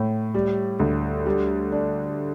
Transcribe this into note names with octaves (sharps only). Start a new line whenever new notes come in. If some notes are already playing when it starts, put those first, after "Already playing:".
Already playing: A2
G3
D2
G3
D4